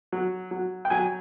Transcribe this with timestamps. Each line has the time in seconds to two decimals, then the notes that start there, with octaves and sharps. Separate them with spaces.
0.13 F#3
0.51 F#3
0.85 G5
0.90 F#3 G#5